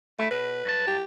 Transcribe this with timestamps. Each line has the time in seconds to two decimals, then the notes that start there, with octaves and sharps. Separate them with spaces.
0.19 A3 E4
0.31 B2 B4
0.65 G2 F#3 A5
0.87 G4